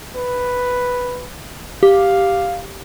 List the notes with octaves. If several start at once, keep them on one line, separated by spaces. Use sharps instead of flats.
B4
G4 F5